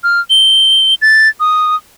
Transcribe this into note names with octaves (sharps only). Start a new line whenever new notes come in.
F6
G7
A6
D#6